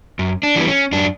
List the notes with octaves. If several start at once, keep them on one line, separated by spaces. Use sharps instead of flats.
F#2
D4
E3 G3 B3
C#4
F#2 D4